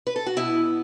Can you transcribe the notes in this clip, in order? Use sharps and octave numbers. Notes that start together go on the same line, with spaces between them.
B4
A4
F#4
B2 B3 E4